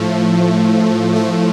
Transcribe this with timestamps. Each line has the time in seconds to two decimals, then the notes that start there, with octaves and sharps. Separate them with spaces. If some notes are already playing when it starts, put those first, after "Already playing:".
Already playing: A2 F3 A3
1.16 A3